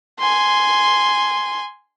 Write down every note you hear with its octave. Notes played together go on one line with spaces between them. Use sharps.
G#5 C6